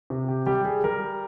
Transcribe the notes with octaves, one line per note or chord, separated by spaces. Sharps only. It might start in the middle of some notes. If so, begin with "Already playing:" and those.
C3
G4
G3 G4
G#4
G3 A#4